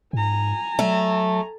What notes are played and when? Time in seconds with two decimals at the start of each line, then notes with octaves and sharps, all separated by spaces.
0.13 G#2 G#5 A#5
0.79 F#3 A3